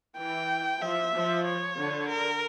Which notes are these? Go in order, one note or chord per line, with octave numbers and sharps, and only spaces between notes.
E3 G5
F3 E5
F3
C#5
D3
A#4